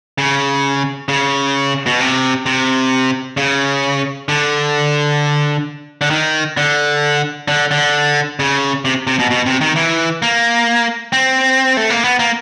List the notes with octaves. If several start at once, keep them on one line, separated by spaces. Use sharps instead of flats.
C#3
C#3
B2
C3
C3
C#3
D3
D3
D#3
D3
D3
D3
C#3
C3
C3
B2
B2
C3
D#3
E3
A#3
C4
A3
A#3
B3
A#3